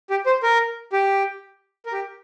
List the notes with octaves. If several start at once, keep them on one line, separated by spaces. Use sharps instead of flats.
G4
C5
A#4
G4
A#4
G4